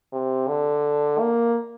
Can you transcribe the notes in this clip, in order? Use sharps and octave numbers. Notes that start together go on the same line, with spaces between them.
C3
D3
A#3